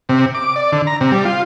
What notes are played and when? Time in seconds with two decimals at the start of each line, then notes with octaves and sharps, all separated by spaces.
0.09 C3
0.35 D6
0.56 D5
0.72 D3
0.87 A#5
1.01 C3
1.12 G3
1.25 F4